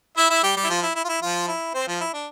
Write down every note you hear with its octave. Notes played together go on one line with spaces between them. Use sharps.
E4 E5
E4 E5
G3 G4
G3 G4
E4
F3 F4
E4
E4
F4
E4
F3 F4
E4
C4 C5
F3 F4
E4
D4